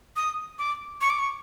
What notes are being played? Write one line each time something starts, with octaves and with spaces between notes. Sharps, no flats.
D#6
D6
C#6
D6
C#6